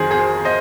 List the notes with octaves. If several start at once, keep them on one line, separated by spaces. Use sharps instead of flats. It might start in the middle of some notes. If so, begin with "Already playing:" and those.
Already playing: F2 D#3 G#4 C5
G#4 C5
C5 D#5